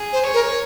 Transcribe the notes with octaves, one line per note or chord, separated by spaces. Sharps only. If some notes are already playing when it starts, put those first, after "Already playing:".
Already playing: G#4
C5
C#5
A#4